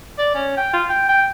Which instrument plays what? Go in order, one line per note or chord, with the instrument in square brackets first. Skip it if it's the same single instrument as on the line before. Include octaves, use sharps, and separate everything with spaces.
[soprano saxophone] D5
C#4
G5
F4
G5
G5